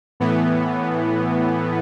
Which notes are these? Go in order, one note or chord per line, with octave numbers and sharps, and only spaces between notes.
A2 E3 B3